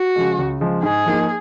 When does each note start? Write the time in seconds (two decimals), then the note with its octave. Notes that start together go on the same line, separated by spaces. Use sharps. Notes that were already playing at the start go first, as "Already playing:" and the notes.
Already playing: F#4
0.16 C#3 F3 G#3
0.38 C#2
0.60 C#3 F3 G#3
0.83 G#2 G#4
1.06 F3 A#3 D#4